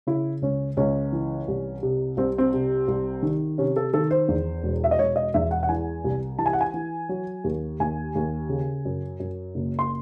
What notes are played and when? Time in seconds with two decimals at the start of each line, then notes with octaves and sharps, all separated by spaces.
0.07 C#3 E4
0.42 C#2 C#4
0.77 C#2 C#4
1.12 E3
1.48 C2
1.83 C3
2.17 C2 C4
2.38 C4
2.53 C3
2.88 C2
3.22 D#3
3.58 C3 C#4
3.76 A4
3.94 D#3 A4
4.11 C5
4.28 E2
4.63 E1
4.84 E5
4.91 D#5
4.98 E1 C#5
5.16 D#5
5.34 E2 E5
5.51 F#5
5.63 F#5
5.69 E3 G#5
6.04 C2
6.39 E3 A5
6.46 G#5
6.53 F#5
6.61 G#5
6.74 E3
7.09 F#3
7.44 D#2
7.80 D#2 G#5
8.15 D#2
8.49 C#3
8.85 F#2
9.20 F#2
9.55 F#1
9.79 C6